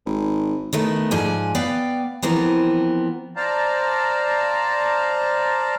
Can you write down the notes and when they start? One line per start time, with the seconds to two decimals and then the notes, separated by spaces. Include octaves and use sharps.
0.06 G#1
0.73 D#3 A3 B3
1.11 G#2 F3 D5 G#5
1.55 B3 D5 F5 G5
2.22 E3 F3 B3 C4 A#4
3.36 C5 D5 F5 A5 A#5